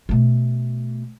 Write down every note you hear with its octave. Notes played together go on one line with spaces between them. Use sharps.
B2 A3